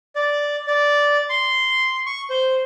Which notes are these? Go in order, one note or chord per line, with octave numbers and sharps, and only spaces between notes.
D5
D5
C6
C#6
C5